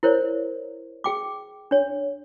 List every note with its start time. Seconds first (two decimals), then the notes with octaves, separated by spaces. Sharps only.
0.03 E4 A#4 C5 C#5
1.04 G#4 G5 D6
1.71 D4 C#5